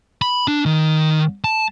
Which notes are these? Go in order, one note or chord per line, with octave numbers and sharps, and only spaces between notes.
B5
D4
D#3
A5